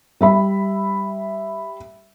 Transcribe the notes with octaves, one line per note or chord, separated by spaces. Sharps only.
G3 E5 B5